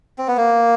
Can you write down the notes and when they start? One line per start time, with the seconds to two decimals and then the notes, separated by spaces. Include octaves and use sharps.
0.18 C4
0.28 B3
0.37 A#3